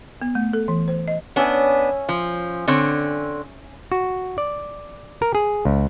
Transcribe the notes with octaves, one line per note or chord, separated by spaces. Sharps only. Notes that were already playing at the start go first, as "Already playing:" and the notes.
B3
A3
A4
E3
C5
D#5
B3 C#4 D4 E5 G#5
F3
D3 C4 C#5
F#4
D5
A#4
G#4
C#2